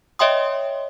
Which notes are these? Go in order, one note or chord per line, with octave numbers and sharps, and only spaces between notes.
C#5 D#5 E5 G5 C6 D#6